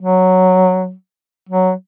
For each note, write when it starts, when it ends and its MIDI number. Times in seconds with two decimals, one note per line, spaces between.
0.02 0.92 54
1.49 1.71 54